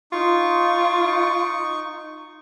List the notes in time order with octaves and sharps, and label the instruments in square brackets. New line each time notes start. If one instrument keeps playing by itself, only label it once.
[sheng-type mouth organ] D#4 C#6 [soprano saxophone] F4